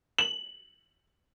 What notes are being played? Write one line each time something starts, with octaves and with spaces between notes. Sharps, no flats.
F#7